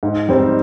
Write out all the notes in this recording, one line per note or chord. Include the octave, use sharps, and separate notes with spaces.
G#2
G3 C4 D#4